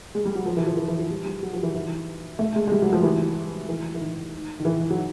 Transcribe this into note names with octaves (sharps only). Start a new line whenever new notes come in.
G#3
G3
F#3
F3
E3
F3
E3
E3
F3
G3
G3
F#3
F3
E3
E3
A3
G#3
G#3
G3
F#3
F3
E3
E3
E3
D#3
D#3
E3
F#3